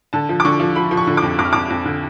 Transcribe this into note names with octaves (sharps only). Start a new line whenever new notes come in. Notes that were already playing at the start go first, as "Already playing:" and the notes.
D3 A5
F3
D6
D3 C#6
F3
F3 B5
F3
C#6
D3
D6
F2
F2 D6
F6
F2 D6
F2
D3